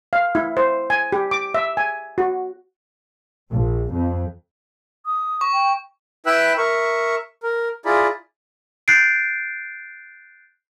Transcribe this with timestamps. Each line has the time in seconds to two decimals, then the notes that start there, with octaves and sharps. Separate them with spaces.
0.13 F5
0.35 E4
0.57 C5
0.90 G#5
1.12 G4
1.31 D6
1.54 E5
1.77 G#5
2.18 F#4
3.51 A#1
3.93 F2
5.06 D#6
5.41 C#6
5.53 G5
6.26 E4 B4 E5 G5 E6 F#6
6.58 A#4 E5 C#6
7.43 A#4
7.85 E4 F4 G#4 D5 A#5 B5
8.88 F#6 G6 A6 C7 D7